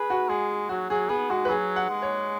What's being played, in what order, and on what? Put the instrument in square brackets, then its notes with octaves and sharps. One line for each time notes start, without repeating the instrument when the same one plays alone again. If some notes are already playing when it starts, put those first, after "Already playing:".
Already playing: [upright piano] G#4 [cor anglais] B4
[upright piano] F#4
[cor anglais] G#3 [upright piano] G#4
[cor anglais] F#3 [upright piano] F#4
[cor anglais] F#3 [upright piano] G#4
[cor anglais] B3 [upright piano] G#4
[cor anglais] G#3 [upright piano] F#4
[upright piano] B4
[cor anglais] F#3 [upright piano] G#4
[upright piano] F#5
[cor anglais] G#3
[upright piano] C#5